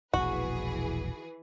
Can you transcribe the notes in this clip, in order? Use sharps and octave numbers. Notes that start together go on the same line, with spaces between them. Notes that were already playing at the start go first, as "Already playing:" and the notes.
E1 A#1 E3 F#4 G#4 B4